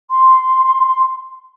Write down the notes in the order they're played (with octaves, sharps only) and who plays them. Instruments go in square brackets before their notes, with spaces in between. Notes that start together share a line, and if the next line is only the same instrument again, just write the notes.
[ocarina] C6